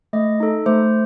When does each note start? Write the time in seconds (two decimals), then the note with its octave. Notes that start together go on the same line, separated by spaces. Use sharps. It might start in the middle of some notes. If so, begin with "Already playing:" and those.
0.13 A3 D#5
0.40 D#4 A4
0.66 A3 C5